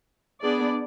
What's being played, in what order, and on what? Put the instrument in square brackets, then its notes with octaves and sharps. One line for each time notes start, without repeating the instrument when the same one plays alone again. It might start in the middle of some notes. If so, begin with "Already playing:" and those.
[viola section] B3 D4 G#4 D5